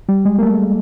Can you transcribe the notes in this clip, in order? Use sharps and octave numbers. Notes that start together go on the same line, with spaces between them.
G3
G#3
A#3
A3